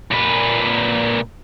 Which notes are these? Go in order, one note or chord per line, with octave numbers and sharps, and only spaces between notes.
A#2 B4